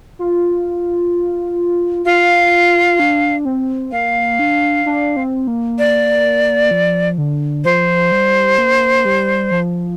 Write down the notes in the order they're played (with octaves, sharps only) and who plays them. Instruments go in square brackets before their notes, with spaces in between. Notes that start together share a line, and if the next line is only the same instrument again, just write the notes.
[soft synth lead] F4
[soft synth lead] F4 [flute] F5
[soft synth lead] D4
C4
[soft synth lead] A#3 [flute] F5
[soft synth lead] D4
D4
C4
A#3
[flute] D5
[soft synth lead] F3
D3
[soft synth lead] F3 [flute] C5
[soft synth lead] G3
A#3
G3
F3